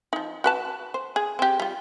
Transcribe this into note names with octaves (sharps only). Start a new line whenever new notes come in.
F3 D#4
F#4 B4 A5
C5
G#4
C4 G4
G3 F4